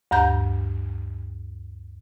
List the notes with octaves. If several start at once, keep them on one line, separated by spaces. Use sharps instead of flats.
D2 G2 A#5 G6